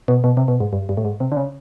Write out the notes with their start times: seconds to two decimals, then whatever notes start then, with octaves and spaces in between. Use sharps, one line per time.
0.08 B2
0.24 B2
0.37 C3
0.48 B2
0.60 G#2
0.73 G2
0.89 G2
0.97 A2
1.05 G#2
1.20 C3
1.32 D3
1.37 C#3